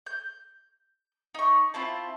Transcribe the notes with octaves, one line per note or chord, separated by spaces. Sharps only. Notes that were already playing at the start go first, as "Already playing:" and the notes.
G6
D#4 C#6
C4 E4 F4 A5